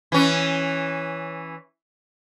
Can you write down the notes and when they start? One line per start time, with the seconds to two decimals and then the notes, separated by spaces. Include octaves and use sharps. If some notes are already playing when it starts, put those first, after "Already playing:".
0.12 E3 C#4